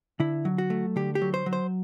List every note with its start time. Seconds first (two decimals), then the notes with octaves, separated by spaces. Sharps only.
0.20 D3 E4
0.45 F#3
0.58 F#4
0.70 A3
0.96 D3 G4
1.15 G4
1.22 F#3
1.34 C5
1.46 F#3
1.53 C5